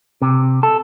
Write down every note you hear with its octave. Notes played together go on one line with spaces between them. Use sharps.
C3
A4